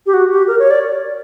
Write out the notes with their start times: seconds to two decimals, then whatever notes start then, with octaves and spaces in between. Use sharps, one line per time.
0.06 G4
0.14 F#4
0.31 G4
0.47 A#4
0.59 C#5
0.71 D5